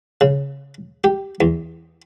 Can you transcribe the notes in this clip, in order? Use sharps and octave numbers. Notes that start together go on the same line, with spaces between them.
C#3
G4
E2